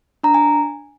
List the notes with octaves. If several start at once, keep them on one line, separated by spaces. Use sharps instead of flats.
D4 A#5
G#5